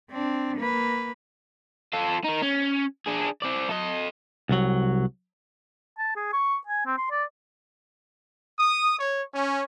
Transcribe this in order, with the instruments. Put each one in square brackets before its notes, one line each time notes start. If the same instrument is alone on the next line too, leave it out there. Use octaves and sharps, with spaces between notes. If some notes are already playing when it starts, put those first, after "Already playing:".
[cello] C4 D4
A#3 B4
[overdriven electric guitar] F4 A4
D#4 A#4
C#4
D4 G#4
C4 D5
A4 D#5
[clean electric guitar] C2 F#3
[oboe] A5
G#4
C#6
G#5
C4
C6
D5
[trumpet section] D#6
C#5
C#4